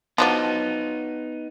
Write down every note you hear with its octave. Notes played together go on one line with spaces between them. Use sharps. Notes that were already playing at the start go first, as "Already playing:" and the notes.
F3 F#3 B3 D4 D#4